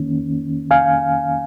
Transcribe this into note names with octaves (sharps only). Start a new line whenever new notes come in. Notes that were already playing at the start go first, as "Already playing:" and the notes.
Already playing: D#3 A#3 C#4
F5 G#5